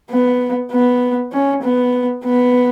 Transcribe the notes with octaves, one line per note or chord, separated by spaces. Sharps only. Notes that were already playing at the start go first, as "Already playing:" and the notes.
B3
B3
C#4
B3
B3